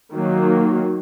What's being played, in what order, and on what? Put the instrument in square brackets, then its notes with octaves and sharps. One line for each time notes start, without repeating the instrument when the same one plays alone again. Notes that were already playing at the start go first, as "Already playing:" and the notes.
[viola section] D#3 F#3 A#3